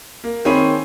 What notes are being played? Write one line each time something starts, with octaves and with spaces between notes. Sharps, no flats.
A#3
D#3 C4 G#4 C#5 B5 D#7